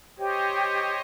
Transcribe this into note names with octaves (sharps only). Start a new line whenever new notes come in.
G4 C5 C#5 D#5 G5